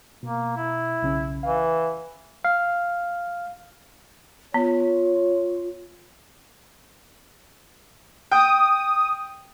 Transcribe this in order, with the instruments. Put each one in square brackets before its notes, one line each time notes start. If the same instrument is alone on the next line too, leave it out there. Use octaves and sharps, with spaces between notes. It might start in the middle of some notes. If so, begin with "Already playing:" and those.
[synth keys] B2 [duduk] A#3
[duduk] E4
[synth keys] B1 C#3 C#4
[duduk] E3 [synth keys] F5
[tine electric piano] F5
[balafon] B3 [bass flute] F4 [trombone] C#5
[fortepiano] G5 [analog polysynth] D#6